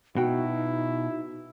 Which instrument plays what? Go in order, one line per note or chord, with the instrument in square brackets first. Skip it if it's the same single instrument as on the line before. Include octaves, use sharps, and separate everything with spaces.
[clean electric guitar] B2 [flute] D#4 [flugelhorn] E4 [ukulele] F#4 G5